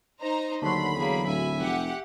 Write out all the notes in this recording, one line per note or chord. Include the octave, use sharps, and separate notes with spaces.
D#4 C5 A#5
D#2 D3 F#3 A3 B5 C6
E2 A#3 G#4
D1 E5 G#5
F1 G4 F#5